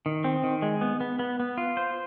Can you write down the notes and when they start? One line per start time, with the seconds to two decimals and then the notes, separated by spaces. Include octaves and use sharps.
0.06 D#3
0.24 C4
0.44 D#3
0.62 G#3
0.81 B3
1.01 B3
1.19 B3
1.40 B3
1.57 F4
1.77 C5